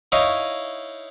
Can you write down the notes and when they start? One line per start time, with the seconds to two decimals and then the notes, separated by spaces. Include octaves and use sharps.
0.12 D#4 E4 C#5 D#5 F5